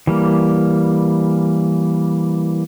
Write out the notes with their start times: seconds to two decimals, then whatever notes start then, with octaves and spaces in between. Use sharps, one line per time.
0.07 E3 G3 A#3